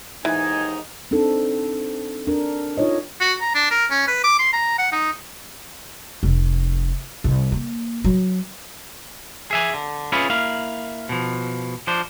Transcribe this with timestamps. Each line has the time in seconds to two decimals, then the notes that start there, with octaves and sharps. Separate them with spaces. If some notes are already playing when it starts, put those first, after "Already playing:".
0.25 D#2 G#2 E3 D#4 G#5
1.11 C4 D4 D#4 A4
2.27 D4 A#4
2.77 D#4 F4 C#5 D#5
3.21 F#4
3.41 A#5
3.54 D4
3.71 A#4
3.90 C#4
4.08 B4
4.24 D6
4.39 C6
4.53 A#5
4.79 F#5
4.92 D#4
6.23 F1
7.24 C2
7.52 A#3
8.04 F#3
9.51 G#4 E5 G#5
9.74 D3
10.12 C#4 E4 F4 G#4 B4
10.30 A#3 E4 F5
11.09 B2 F3
11.87 F3 D4 C5